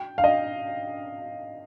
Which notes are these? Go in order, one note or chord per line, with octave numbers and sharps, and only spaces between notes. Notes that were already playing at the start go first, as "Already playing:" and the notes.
Already playing: G5
F5
D#5